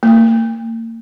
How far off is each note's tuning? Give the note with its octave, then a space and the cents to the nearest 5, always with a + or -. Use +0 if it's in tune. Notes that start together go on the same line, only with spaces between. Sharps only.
A#3 -40